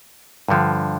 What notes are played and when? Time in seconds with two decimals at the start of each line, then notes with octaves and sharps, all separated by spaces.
0.48 G2 D3 F3